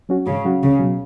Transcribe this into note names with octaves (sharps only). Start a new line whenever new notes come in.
F#3 C#4 F#4
G#2 C#3
F#3 C#4 F#4
C#2 C#3
B2 F#3